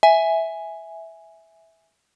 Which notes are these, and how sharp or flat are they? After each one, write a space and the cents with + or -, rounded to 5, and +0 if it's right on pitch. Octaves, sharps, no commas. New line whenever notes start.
E5 -10 G#5 +0